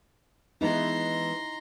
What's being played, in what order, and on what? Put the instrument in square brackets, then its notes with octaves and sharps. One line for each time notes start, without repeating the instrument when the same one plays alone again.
[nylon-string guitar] E3 G#3 B3 [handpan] D#4 E4 [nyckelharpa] A#5 C6